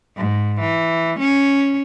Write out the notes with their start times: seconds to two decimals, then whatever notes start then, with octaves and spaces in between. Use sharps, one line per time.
0.17 G#2
0.60 E3
1.20 C#4